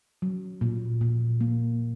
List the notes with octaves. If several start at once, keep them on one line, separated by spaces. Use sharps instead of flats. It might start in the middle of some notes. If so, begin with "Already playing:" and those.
F#3
A#2
A#2
A#3